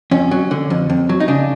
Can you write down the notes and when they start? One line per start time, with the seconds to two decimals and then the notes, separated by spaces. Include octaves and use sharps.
0.11 F2 C#4
0.31 F#3
0.51 D3
0.70 F2
0.90 F2
1.09 F#3
1.20 D#4
1.28 C#3 D4